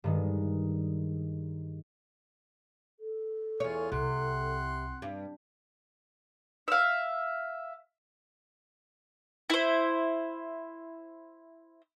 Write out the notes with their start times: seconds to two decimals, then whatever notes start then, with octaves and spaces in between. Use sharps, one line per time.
0.04 G2 D#3 G#3
3.00 A4
3.60 E2 F4 G#4 C#5
3.92 C2 C3 F#5 C6
5.02 G2
6.68 E5 F5
9.50 E4 C5